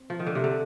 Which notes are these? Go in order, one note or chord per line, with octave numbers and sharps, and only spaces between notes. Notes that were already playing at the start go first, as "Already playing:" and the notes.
Already playing: C4
F3
D#3
D3
C3
D3